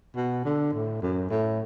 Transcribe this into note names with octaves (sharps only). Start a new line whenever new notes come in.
B2
D3
A2
F#2
A2